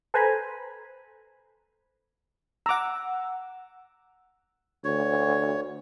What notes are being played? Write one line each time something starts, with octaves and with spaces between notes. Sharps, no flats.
A4 B4 C5 G#5 A#5 B5
F#5 A#5 D6 E6
D2 C#5